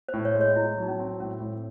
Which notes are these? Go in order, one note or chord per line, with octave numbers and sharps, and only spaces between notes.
C5
A2
C#5
G#3
C#5
A2 E4
F#3
D#4
C#4
C4
A2 C#4
A2